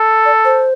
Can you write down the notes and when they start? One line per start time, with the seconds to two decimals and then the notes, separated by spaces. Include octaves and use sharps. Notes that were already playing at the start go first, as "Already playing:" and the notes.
Already playing: A4
0.25 D5
0.45 C5